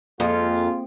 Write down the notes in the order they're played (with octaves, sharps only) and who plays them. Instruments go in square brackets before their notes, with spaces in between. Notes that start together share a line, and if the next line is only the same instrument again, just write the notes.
[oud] F2 [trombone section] G#3 F4 [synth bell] A#3 A4